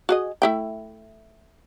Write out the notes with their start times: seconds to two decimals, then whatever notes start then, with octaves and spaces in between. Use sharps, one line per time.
0.09 F#4 G#4 D#5
0.42 A3 E4 G5